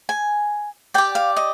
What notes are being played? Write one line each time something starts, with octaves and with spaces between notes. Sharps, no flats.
G#5
G4 D5 G5
F5
D#5